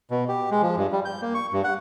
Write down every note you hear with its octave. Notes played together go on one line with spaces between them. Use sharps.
B2
G4
G#3
F3
G2
G3
G6
A#3
C#6
G2
F#5